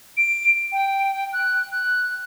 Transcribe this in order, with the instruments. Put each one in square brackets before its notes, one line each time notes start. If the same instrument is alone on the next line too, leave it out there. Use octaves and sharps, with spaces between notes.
[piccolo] D7
G5
F#6
F#6